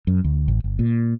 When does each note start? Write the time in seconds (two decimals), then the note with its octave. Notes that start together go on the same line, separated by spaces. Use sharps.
0.07 F#2
0.24 D2
0.48 A1
0.64 G1
0.79 A#2